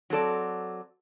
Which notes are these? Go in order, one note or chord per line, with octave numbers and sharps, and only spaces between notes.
F#3 C4 A4 D5